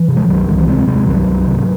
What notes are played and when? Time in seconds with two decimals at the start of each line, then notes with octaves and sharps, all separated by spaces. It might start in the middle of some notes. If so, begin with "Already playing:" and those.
Already playing: E3
0.08 C3
0.16 G#3
0.28 C2 D#3 F#3
0.48 C2 E3 G#3
0.58 C#4
0.67 C3 G#3 C4
0.87 C3 G#3 C4
1.07 C2 D#3 F#3
1.26 C2
1.47 C3